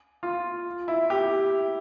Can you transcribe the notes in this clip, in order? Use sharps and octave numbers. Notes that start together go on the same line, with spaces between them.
F4
E4
G4